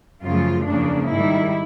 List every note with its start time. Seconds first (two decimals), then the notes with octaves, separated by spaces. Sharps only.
0.23 F#2 C#3 F3 A3 F4
0.66 E2 C#3 F3 A#3 D4
1.09 G#2 D#3 G3 E4